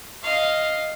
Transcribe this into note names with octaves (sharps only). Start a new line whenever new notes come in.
D#5 F5